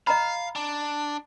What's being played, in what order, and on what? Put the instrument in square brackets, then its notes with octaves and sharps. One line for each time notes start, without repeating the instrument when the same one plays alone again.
[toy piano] D#5 A#5 B5 [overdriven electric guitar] F5
[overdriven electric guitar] D4